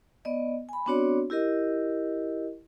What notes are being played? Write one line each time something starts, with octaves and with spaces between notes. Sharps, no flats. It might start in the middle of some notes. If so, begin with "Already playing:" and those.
B3 D5 D#5
G#5 B5
B3 C4 D4 F#4 C#5 D5
E4 G4 A#4 D#5